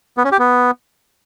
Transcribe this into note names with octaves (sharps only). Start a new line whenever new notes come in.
B3
C#4
G4
B3